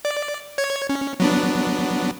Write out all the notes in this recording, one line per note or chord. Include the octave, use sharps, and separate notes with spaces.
D5
C#5 G#6
C#4
F#3 B3 D4